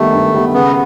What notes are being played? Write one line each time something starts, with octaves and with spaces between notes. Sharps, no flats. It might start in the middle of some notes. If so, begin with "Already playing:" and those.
Already playing: D#3 G3 A3 B3
G2
D#3 G3 B3
C#3 B3